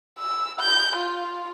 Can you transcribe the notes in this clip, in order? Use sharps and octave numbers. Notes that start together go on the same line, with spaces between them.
E6
G6
F4